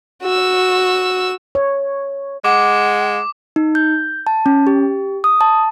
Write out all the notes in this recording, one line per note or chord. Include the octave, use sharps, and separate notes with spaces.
F#4 E6
C#5
G#3 F#5 D6
D#4
G6
A5
C#4
G4
D#6
A5